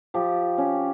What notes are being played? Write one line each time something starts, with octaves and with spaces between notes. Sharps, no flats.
F3 G4
C#4